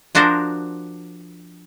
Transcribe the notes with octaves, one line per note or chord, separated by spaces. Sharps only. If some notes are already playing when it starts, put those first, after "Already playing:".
F3 D4 F#4 A#4 C5